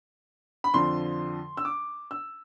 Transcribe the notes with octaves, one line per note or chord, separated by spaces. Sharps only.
B5
F2 D3 F3 C6
E6
D6
E6